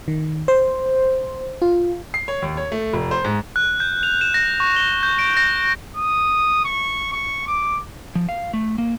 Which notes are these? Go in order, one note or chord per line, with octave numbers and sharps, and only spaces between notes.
D#3
C5
F4
C7
C#5
D#2
C#5
A3
F1
C5
G#2
F#6
G6
F7
E7
A#6
C#6
G7
G6
D7
A#6
D#6
C#6
C#6
D6
F3
F5
A3
A#3